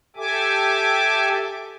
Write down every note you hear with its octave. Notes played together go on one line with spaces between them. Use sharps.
G4 A4 E5 G#5 D6